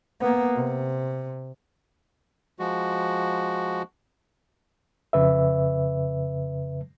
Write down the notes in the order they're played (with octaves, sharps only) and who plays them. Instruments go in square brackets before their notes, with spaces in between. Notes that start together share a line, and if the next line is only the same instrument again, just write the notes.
[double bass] A#3 B3
C3
[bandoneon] F3 G#3 F#4
[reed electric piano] F2 C#3 B4 E5